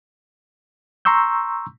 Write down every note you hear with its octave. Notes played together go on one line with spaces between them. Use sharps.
A#5 C6 C#6 E6 G6